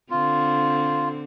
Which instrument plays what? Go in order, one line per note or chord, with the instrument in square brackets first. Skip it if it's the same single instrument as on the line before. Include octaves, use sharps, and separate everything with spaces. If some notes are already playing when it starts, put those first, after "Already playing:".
[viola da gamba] D3 C4 [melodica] F4